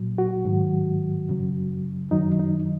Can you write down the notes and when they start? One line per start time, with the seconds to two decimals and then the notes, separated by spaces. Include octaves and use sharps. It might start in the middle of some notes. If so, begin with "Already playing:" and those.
Already playing: A#2 F#3
0.18 F#4
0.45 G#2 D#3 F#3
1.29 F#2 C#3 F#3
2.11 F#2 D#3 F#3 D#4
2.39 D#4